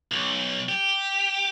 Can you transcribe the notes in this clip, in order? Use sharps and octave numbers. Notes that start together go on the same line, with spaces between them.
B1
G4